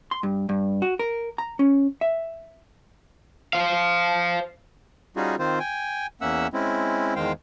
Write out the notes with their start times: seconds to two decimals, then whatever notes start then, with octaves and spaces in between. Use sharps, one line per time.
0.11 C6
0.23 G2
0.49 G2
0.82 F#4
0.99 A#4
1.38 A#5
1.59 C#4
2.01 E5
3.53 C5 F5
5.16 G3 C#4 D#4 F4 F#4 G#4
5.39 D#3 C4 F4 C5
5.59 G5 G#5
6.21 E2 A#3 C#4 E5 F#5 E6
6.53 G#3 C4 C#4 E4
7.16 E2 D#3 G#3 C5 F5 G5